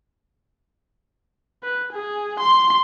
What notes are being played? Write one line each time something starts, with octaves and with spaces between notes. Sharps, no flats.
B4
G#4
C6